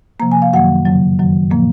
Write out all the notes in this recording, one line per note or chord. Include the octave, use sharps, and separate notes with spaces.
C3 F3 A#3 A#5
G#5
F5
F#2 D#3 F#3 A#3 F#5
F2 C#3 F#3
F#2 D#3 F#3
A#2 F3 A#3